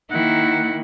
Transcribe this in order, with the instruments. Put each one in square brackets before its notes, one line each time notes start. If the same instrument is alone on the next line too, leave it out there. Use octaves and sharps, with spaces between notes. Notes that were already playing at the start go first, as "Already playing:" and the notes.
[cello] D#3 A#3 [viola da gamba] E4 [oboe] F#5